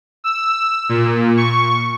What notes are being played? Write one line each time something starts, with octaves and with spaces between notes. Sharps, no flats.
E6
A#2
C#6